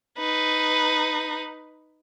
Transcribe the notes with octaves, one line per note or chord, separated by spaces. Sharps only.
D#4 B4